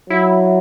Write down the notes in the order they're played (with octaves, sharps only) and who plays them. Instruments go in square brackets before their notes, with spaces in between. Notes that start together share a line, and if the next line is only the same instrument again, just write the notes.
[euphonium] F#3 [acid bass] E4